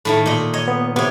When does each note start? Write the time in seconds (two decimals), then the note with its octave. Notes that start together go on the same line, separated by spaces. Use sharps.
0.05 A2 D#3 A3
0.26 A#2 D#5
0.54 C#5 D#5
0.68 B3
0.96 C3 B3 C#5